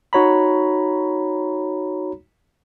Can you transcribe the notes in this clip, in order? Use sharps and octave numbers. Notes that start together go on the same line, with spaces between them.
D#4 F#4 C#5 A#5 B5